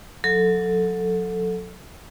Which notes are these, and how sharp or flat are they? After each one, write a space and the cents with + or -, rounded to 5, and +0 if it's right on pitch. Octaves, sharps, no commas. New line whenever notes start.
F#3 -30 A4 +0